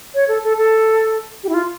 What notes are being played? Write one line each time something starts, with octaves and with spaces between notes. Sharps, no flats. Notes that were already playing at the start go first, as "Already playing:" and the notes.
C#5
A4
A4
A4
G4
E4
F4